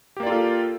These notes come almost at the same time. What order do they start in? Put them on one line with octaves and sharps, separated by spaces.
G4 A#3 D5 F4 A4